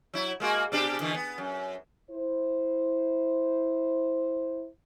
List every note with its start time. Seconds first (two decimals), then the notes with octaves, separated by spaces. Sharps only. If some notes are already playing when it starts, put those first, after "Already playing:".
0.14 F#3 E4
0.40 G#3 A#3 F#4
0.72 B2 D4 G4
1.00 B2 D3 E3
1.14 B3
1.38 F#2
2.11 E4 C5